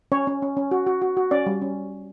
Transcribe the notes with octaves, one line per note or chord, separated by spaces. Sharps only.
C#4 C#5
C#4
C#4
C#4
F#4
F#4
F#4
F#4
C#4 D5
G3
C#4